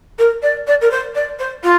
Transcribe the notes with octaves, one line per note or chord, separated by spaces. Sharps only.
A#4
D5
D5
A#4
C5
D5
C5
F4